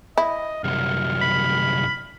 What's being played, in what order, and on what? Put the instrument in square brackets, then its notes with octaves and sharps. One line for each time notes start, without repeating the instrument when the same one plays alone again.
[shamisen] E4 [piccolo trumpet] D#5
[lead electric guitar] C2 F#2 [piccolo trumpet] F6
[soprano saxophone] B5